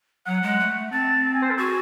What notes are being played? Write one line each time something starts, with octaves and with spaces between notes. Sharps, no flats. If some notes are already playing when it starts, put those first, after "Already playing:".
F#3 F#5
G#3
A3
C4 A5
A5
G#5
C5
A4
F#4 G#4